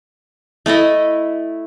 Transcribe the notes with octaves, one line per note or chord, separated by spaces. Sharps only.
A3 E4 A4 D#5